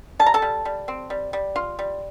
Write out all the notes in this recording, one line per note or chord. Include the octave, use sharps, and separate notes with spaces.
G3 A5
A#5
A4 A5
G3
G3
C4
G3
G3
F4
G3